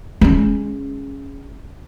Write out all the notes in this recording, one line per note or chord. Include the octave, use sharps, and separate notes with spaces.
G#3 C#4